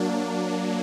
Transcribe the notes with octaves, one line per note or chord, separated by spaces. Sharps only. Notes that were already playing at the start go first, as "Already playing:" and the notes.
Already playing: F#3 A#3 D4